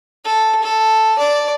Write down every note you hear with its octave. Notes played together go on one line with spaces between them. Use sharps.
A4
A4
D5